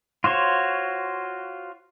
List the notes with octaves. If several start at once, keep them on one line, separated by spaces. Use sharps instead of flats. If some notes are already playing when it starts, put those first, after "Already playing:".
F4 F#4 C5 C#5